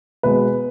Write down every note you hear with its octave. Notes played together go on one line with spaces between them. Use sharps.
B2 G#3 B3 B4